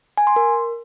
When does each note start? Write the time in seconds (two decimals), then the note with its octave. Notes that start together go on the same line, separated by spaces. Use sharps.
0.17 G#5
0.27 C6
0.36 A#4